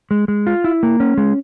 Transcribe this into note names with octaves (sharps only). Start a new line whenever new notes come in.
G#3
G#3
F4
E4
A#3
C#4
G#3